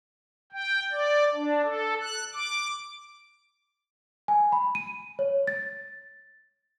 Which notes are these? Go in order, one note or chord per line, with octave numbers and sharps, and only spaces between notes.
G5
D5
D4
A4
F#6
D6
G#5
B5
D#7
C#5
A6